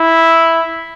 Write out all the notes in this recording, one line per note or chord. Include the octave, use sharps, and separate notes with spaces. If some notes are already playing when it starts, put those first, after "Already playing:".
Already playing: E4